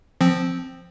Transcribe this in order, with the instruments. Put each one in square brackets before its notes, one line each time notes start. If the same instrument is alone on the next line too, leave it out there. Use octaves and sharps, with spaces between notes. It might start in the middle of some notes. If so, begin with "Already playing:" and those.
[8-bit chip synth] F3 C4